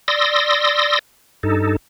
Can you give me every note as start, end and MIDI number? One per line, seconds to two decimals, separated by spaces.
0.08 0.99 74
0.08 0.99 84
0.08 0.99 87
0.08 0.99 88
0.08 0.99 94
1.43 1.76 43
1.43 1.76 63
1.43 1.76 69